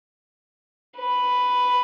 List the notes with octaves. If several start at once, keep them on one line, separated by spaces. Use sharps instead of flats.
B4